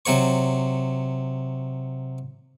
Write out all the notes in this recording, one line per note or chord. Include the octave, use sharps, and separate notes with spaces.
C3 F#3 C#5 C#6